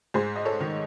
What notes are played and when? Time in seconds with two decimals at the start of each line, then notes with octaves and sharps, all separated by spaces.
0.14 G#2 G#4 C5
0.36 D#5
0.45 A4 C#5
0.60 D#3